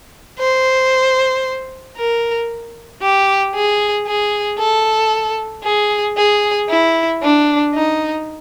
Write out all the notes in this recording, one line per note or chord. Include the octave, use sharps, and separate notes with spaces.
C5
A#4
G4
G#4
G#4
A4
G#4
G#4
E4
D4
D#4